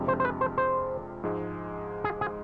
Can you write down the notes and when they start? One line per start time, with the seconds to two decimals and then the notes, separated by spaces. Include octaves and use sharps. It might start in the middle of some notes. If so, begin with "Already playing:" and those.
Already playing: F2 C3 G#3 D4 F4
0.08 C5
0.20 C5
0.25 B4
0.41 C5
0.58 C5
1.23 G#2 F3 G#3
2.04 G#4
2.21 G#4